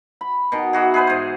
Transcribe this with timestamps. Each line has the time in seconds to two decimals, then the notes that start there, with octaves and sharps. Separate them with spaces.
0.21 B5
0.52 B2 D#3
0.73 E3 F#4 G#4
0.94 G#4 B4 C5
1.07 G#2 C5